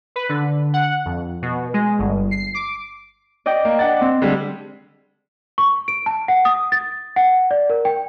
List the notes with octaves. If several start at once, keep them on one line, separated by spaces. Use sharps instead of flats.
B4
D3
F#5
F2
B2
G#3
G1
C7
D6
D5 D#5 G5
A#3
D4 F#5 A6
C4
D3 G3 G#3
C#6
D7
A5
F#5
D#6
A6
F#5
D5
A#4
G5